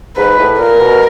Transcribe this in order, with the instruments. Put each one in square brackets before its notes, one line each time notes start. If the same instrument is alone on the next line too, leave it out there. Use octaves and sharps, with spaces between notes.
[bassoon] G#2 [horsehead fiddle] B4
[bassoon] A2
[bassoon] A#2 [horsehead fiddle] A#4
[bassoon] B2